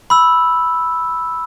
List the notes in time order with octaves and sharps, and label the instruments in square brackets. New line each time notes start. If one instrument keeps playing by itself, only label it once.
[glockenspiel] B5 E6